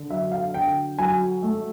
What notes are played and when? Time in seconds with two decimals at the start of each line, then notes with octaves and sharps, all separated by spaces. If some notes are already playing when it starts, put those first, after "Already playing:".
Already playing: D3
0.10 F#3 E5
0.32 F5
0.54 D3 G5
0.98 F#3 G#5
1.43 A3